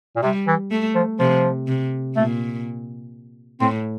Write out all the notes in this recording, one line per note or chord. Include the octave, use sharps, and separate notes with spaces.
A#2
C3 G3
E3
A3
F3
C3 F3
C3
A#2 A3
A2 C4